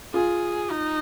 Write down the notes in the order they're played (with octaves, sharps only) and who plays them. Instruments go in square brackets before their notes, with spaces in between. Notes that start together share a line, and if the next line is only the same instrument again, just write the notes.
[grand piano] F4 [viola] G#4
[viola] D#4